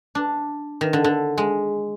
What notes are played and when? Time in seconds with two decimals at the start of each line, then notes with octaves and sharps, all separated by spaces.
0.15 D4
0.81 D#3
0.93 D3
1.04 D3
1.38 G#3